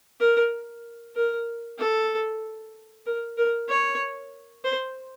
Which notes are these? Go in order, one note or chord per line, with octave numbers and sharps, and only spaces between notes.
A#4
A#4
A4
A#4
A#4
C#5
C5